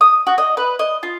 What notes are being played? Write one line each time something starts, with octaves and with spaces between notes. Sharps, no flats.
D#6
F#4
D#5
B4
D#5
F4